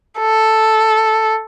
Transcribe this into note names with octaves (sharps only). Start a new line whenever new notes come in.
A4